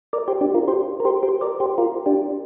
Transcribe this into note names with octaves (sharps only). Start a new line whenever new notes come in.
A#4 D5
G4 C5
D4 G4
F4 A#4
G4 C5
A#4
G4 C5
G4 C5
A#4 D5
G4 C5
F4 A#4
D4 G4